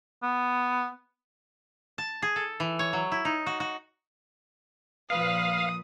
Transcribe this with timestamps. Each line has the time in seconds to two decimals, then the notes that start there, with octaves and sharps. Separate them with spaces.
0.23 B3
1.98 A5
2.22 G#4
2.36 A4
2.60 E3
2.79 C#5
2.93 F#3
3.12 E4
3.25 D#4
3.46 F#4
3.60 F#4
5.10 A#2 F3 B4 F5 D#6